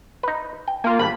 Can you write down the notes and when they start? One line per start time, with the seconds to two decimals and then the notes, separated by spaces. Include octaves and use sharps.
0.23 D#4 B4
0.68 G5
0.84 A#3 F4
0.99 G#1 G2 B5